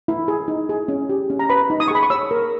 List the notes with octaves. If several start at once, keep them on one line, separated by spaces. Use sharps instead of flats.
E4
G#4
D#4
G#4
C#4
G4
C#4
A#5
B4 B5
D#4
D#6
C#6
G#4 B5
C#6
C#5 E6
A#4